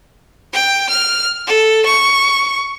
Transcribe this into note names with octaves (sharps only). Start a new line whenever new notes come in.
G5
F6
A4
C#6